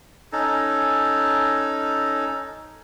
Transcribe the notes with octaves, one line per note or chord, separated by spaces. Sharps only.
C#4 D#4 A4